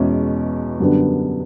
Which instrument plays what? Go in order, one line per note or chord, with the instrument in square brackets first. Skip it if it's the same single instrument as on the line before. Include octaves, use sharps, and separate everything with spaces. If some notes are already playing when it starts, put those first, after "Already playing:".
Already playing: [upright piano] E2 B2 G#3 C#4 E4
F#2 D3 G3 B3 D4